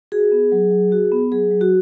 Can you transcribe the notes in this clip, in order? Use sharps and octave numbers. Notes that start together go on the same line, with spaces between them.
F#4 G#4
B3
F#3
F#3
F#4
B3
F#3 G#4
F#3
F#4